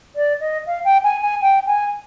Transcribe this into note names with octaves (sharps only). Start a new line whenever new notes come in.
D5
D#5
F5
G5
G#5
G#5
G5
G#5